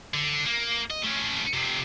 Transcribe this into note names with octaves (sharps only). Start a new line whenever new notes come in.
D3
A#3
D#5
A3 C#4
F2 C3